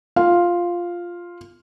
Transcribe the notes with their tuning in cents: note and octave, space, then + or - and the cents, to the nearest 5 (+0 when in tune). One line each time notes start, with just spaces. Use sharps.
F4 +0 F5 +0